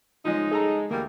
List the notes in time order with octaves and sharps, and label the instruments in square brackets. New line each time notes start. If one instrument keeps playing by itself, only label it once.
[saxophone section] C#3 D#4 [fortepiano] F3 G#3
[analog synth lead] G#3 [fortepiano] G#4 A4 A#5
[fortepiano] D2 [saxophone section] E3 G3 A#3